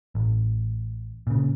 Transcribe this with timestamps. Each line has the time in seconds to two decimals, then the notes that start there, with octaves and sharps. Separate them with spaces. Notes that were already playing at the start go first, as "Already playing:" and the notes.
0.15 A1
1.27 A#2 C#3